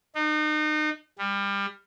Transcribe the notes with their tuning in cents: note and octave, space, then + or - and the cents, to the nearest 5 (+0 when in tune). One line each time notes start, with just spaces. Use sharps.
D#4 -35
G3 +25